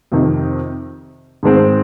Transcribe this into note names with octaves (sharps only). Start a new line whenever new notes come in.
F2 C3 D#3
G#2 D#3 G#3 C4